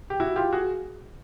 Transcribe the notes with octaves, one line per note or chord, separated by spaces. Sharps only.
G4
E4 F#4
F4 G4
F#4 G#4